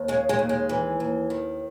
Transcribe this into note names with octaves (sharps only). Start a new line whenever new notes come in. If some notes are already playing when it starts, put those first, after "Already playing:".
Already playing: D#2
C#3 G#3
G#3
D#2
G#3
E3
D#2
D#3